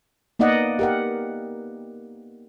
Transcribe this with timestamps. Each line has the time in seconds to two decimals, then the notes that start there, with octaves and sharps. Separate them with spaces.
0.39 A#3 B3 D#4 D5 D#5 F#5
0.79 G4 A#4 F#5